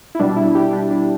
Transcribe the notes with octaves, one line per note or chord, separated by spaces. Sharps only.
E4
B2 G3 D4
E4
G4
D4
D4